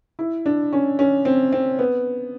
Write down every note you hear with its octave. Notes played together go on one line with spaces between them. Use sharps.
E4
D4
C#4
C#4
C4
C4
B3